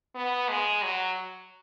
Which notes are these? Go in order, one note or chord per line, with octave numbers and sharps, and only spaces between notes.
B3
G#3
F#3